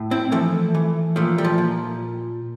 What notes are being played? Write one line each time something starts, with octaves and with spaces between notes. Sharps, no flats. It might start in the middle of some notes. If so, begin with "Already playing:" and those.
Already playing: A2
C4 E4
E3 F3 A3
E3
A#2 F3 A3
G3
F3
A#2